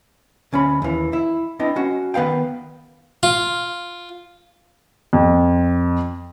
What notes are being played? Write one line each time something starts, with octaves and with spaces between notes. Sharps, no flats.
D2 C#4 C#5 B5
D#2 E3
E4
B3 C4 D4 E4 D#5
C#4 F#4
D#3 B3 B4 F5 G5
F4
F2